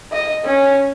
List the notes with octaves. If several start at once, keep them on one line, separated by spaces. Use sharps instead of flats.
D#5
C#4